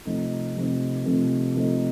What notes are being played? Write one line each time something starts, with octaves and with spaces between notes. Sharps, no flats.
C3 F3 A3 C4 D#4
C3 F3 A3 C4 D#4
C3 F3 A3 C4 D#4
C3 F3 A3 C4 D#4